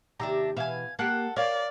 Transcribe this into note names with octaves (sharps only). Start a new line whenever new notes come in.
D#2 C3 D4 G4 E5 A#5
B2 E3 E5 F5 G5 G#5
A#3 G4 A4 F#5 F#6
A#4 C#5 D5 F5